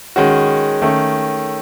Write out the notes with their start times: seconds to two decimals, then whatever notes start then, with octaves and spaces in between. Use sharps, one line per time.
0.16 D#3 G#3 C#4 F#4
0.82 D#3 A3 C#4